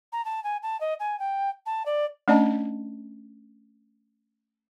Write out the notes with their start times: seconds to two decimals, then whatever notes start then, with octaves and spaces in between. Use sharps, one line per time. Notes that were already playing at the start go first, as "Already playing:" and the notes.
0.13 A#5
0.25 A5
0.44 G#5
0.63 A5
0.81 D#5
1.00 G#5
1.20 G5
1.66 A5
1.86 D5
2.28 A3 C#4 D4 D5 D#5 A5